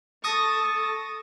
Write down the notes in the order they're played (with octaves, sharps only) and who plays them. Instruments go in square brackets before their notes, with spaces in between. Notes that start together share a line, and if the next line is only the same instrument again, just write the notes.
[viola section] A4 A5 [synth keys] C#6 D#6 A#6